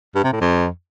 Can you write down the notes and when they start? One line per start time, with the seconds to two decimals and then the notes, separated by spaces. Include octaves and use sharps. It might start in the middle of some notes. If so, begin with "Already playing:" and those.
0.15 G2
0.24 C3
0.32 A2
0.41 F2